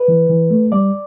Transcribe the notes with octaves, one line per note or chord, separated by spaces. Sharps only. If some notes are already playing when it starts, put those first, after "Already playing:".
Already playing: B4
E3
E3
A3
G3 D5